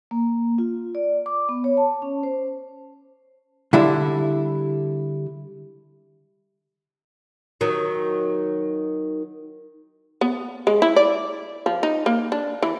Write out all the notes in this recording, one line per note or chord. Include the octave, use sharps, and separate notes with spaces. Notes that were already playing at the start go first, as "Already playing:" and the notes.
A#3
F4
D5
D6
B3
C#5
A5
C#4
C5
D3 G3 E4
D#3 F#3
B3
G#3
E4
D5
F3
D#4
A#3
D4
E3